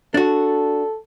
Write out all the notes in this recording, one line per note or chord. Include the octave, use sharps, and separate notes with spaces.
D4 F#4 A4